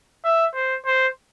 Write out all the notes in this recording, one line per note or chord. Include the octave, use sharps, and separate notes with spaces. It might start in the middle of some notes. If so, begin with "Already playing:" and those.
E5
C5
C5